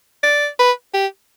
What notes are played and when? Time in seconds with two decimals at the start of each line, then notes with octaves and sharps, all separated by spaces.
0.23 D5
0.59 B4
0.94 G4